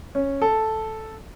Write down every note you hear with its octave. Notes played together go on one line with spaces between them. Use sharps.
C#4
A4